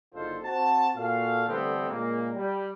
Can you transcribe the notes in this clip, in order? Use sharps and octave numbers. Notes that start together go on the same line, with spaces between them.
F#1 D3 D#4 F4 A4 C5
C4 F#4 A5
A#2 F#4 A4 F5
D3 E3 G3 A3 B3 C4
A#2 C#3 G#3 A#3
G3